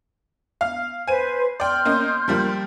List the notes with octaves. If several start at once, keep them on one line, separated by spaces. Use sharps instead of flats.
F5 F6
B4 C5 G#5 D#7
D5 G5 C6 F6 G6
A#3 C#4 D#5
F3 G3 A#3